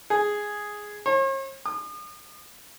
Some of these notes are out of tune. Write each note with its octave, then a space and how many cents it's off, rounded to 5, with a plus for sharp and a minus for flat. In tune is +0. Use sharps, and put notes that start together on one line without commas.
G#4 +0
C#5 -45
D#6 -40